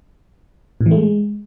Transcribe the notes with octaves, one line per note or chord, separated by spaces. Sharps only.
A2
E3
A3
G#3